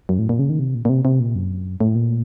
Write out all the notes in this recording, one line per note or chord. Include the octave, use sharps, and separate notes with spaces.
F#2
A2
A#2
C#3
D#3
C3
A#2
A#2
C3
C3
A#2
F#2
A2
A#2